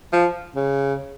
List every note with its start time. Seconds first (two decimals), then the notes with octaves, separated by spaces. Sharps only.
0.13 F3
0.56 C#3